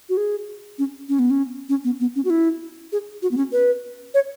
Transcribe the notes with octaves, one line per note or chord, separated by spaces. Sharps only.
F#4
G#4
C#4
C#4
B3
C#4
C#4
B3
B3
C#4
F#4
E4
G#4
F#4
B3
C#4
B4
C#5